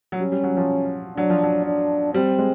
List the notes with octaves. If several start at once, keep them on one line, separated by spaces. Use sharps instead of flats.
F#3
G3 C#4
G3
F#3
F3
F#3 D4
F3
F#3
D4
G3 C4
G#3